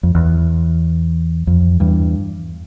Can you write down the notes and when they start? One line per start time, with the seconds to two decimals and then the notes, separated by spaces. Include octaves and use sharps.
0.03 F2
0.15 E2
1.47 F2
1.80 E2 G2